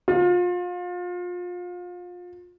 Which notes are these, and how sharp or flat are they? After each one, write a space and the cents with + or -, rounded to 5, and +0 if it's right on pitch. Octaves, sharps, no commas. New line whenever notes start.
F4 +30